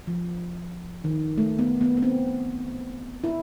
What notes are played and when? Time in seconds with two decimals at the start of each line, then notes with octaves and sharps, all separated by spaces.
0.07 F3
1.04 D#3
1.38 A3
1.59 B3
1.81 B3
1.97 B3
2.02 C4
3.24 E4